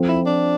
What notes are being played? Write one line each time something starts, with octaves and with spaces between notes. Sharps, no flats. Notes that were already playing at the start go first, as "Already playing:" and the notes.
Already playing: F3 C4 F4 A4
E4
D4